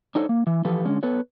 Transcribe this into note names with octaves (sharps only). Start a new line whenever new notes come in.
D4 D#4 A4 C5 C#5
A#3
E3
E3 F3 G4 A4 B4
D3 G#3 C#4
B3 A4 B4 C#5